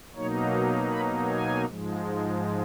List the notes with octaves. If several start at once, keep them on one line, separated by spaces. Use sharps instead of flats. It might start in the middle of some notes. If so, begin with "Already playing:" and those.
B2 F#3 A#3 D#4 C#5
B5
G#5
G#2 F3 G#3